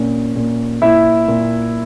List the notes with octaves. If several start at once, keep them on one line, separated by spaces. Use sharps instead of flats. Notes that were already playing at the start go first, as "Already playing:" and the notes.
Already playing: A#2 C#4
A#2
A#2 E4 E5
A#2